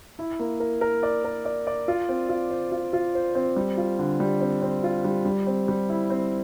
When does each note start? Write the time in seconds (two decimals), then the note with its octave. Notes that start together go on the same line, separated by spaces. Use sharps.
0.19 E4
0.39 A#3
0.60 A#4
0.81 A#4
1.03 D5
1.24 A#4
1.45 D5
1.67 D5
1.88 F4
2.09 C4
2.29 F4
2.50 C5
2.72 F4
2.93 F4
3.15 C5
3.35 C4
3.56 G3
3.78 F4
3.99 D3
4.20 G3
4.41 C4
4.62 C4
4.84 F4
5.04 G3
5.25 G3
5.47 C4
5.68 G3
5.89 E4
6.10 C4